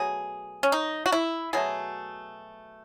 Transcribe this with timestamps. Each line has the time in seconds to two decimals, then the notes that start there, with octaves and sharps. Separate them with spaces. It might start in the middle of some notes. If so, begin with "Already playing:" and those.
Already playing: B2 F#3 A3 G#4
0.63 C#4
0.72 D#4
1.06 F#4
1.12 E4
1.53 B2 F#3 A3 G#4